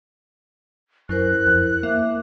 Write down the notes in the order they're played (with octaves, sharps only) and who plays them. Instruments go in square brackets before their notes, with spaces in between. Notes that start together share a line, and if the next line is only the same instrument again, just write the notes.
[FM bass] F#2 [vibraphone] E4 A#4 C5 [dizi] F#6
[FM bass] F2
[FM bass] A#3 [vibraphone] E5 D6